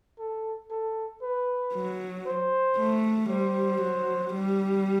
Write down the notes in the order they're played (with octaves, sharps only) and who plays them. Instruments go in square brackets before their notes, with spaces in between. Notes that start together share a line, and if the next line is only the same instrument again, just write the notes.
[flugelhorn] A4
A4
B4
[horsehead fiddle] F#3
[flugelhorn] C5
[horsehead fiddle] A3
[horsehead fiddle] G3 [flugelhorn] C5
[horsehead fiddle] F#3
G3